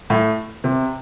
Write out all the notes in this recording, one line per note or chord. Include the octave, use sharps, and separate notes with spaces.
A2
C3